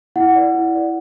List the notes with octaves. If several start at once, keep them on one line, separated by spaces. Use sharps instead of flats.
E4 F#5
B4 D5
E4
B4 D5